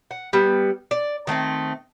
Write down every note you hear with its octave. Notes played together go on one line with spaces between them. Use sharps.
F#5
G3 B3
D5
D#3 A3 A#3 C4